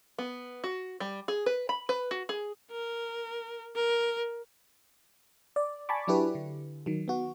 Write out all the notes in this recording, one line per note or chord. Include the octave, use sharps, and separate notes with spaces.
B3
F#4
G3
G#4
B4
B5
B4
F#4
G#4
A#4
A#4
D5
G#5 A5 B5 C#6 D6
F#3 D4 E4 G4 B4
D3
D#3 F#3
B3 F#4